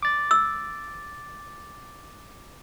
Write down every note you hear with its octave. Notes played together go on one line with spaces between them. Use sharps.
D6 A6
E6